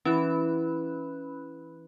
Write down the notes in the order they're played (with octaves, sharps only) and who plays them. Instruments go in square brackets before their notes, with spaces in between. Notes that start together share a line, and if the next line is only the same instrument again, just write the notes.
[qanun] E3 [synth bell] C#4 B5 F#6